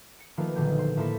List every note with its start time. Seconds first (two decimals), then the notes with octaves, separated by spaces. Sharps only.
0.20 C#7
0.37 D#3 F3 A3 A#3 F4 B4
0.55 B1 A#2 D3 D#3 G#4 G6
0.79 C5 C6
0.97 A2 A#3 E4 A4 C6 B6